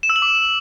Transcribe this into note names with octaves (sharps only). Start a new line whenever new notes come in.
E7
E6
F#7
D6